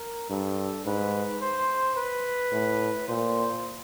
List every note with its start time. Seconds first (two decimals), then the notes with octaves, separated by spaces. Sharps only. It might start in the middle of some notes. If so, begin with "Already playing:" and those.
Already playing: A#4
0.30 G2 A4
0.86 G#2 B4
1.41 C5
1.96 B4
2.52 A2
3.08 A#2 C5